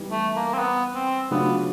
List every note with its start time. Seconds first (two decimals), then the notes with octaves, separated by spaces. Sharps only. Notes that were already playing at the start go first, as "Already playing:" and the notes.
Already playing: E3 G3 B3 D#4 G4
0.11 A3
0.36 A#3
0.54 C4
0.59 B3
0.95 C4
1.30 C#3 F#3 A3 B3 D4 F4